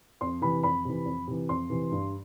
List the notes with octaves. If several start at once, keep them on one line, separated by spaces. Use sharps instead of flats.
F2 C6
C3 E3 B5
F2 B5
C3 E3
F2
C3 E3
F2 C6
C3 E3
G2